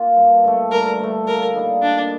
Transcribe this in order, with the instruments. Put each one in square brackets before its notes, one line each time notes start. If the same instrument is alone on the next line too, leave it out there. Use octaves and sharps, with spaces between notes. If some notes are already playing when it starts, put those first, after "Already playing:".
Already playing: [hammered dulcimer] A#3 F4
G2
D3 A3
[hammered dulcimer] G2 [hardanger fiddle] A#4
[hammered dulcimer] D3 A3
[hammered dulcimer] A#2 [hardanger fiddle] A#4
[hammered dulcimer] G3 A#3 D#4
[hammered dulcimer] A#2 [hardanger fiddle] D4